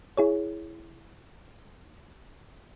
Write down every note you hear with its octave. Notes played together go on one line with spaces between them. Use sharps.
E4 G#4 C#5